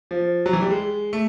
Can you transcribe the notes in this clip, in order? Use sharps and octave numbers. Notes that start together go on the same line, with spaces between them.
F3
F#3
E3
G3
G#3
A3